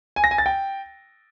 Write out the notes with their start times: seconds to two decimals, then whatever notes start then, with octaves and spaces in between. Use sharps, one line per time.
0.16 G#5
0.24 A#6
0.31 G#5
0.38 A6
0.46 G5